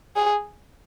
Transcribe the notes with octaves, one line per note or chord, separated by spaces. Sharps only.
G#4